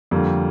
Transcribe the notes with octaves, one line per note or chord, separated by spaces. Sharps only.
F2 D3 G3 A#3